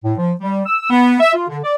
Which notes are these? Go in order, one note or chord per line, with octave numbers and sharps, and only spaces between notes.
A2
F3
G3
E6
B3
E5
F4
D3
D5